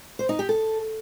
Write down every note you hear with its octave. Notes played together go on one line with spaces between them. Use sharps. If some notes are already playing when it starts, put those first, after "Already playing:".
C5
D#4
G4
A4